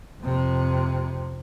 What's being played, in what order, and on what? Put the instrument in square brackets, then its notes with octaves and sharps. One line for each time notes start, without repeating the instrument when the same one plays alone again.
[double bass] F2 C3